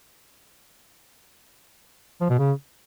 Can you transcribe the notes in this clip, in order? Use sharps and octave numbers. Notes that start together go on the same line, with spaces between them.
F3
B2
C#3